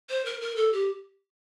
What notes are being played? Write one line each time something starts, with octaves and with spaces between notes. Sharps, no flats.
C5
A#4
A#4
A4
G4